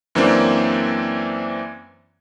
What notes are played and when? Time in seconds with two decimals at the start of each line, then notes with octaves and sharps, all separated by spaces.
0.15 F#2 E3 A#3 C4 D4